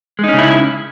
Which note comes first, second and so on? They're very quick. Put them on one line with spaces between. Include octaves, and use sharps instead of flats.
G#3 D#4 C#4 C#3 E4